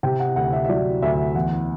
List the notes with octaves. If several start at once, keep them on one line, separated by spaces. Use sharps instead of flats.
C3 G5
F#5
D2 F#5
E5
E5
F#3 D5
D2 E5
E2 F#5